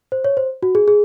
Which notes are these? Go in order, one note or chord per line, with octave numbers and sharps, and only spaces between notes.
C5
C#5
C5
F#4
G#4
G#4